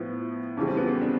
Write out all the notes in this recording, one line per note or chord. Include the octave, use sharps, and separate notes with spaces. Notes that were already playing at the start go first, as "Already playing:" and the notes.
Already playing: A2 F3 B3
F2 C#3 E3 G3 C#4
C4
B3
C4
D4